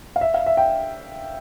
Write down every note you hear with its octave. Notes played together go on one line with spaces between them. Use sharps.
F5
E5
F5
E5
G5